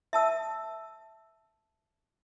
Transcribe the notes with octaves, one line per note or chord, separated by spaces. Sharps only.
E5 A5 E6